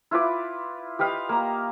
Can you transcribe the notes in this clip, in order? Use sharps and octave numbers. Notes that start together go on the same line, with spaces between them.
E4 F4 B4 D6
G4 B4 D#5 F5
A#3 A#5